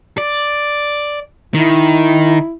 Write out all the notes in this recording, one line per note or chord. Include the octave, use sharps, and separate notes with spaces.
D5
D#3 E4